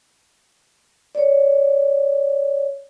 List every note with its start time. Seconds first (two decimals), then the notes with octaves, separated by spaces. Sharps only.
1.15 C#5 D5